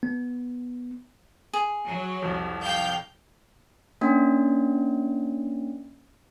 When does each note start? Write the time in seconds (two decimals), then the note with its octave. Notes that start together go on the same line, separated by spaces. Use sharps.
0.03 B3
1.53 G#4
1.86 F#3
2.22 C2 F2
2.62 F5 G5 G6
4.01 A#3 C#4 D4